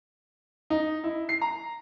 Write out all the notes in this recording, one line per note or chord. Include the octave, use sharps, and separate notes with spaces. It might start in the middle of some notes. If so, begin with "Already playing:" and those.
D#4
E4
C7
A#5